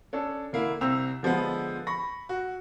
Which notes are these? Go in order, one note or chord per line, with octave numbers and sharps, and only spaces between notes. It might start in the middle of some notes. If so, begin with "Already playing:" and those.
C#4 D4 A4
D3 A#3 E4
C2 C4 E6 F7
D3 F3 G#3 B3
B5 C#6 A#6
F#4